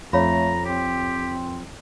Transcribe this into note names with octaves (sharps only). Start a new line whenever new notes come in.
F2 A3 C#5 F5 A#5 B5
C4 G4